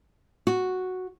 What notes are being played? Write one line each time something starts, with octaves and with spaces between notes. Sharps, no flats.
F#4